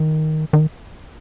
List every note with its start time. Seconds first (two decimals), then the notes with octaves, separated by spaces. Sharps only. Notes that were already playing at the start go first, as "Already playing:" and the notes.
Already playing: D#3
0.53 D#3